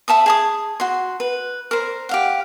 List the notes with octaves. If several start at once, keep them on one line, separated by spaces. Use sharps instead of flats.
E5 A5 B5 D#6
G#4 A5 D#6
F#4 C6
B4
A#4 C5
G4 F5 F#5